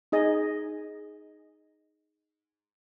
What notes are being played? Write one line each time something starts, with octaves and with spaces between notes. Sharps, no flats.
D#4 G#4 D#5